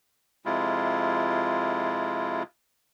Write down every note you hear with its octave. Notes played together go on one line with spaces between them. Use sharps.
F2 C3 G#3 E4 F4